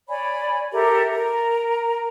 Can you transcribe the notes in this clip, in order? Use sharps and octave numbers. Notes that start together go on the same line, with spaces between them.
C#5 D5 G#5 B5
G4 A4 A#4 E5
A#4